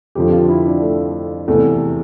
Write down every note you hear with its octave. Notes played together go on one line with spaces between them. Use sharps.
F2 D3 F3 G4
F4
E4
D4
A3
E2 C3 E3 A3